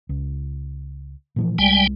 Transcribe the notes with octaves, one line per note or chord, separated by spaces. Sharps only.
C#2
A#2 E3 F3
C2 G3 G#3 G5 G#5